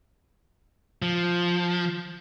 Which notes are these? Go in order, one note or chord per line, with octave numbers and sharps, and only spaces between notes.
F3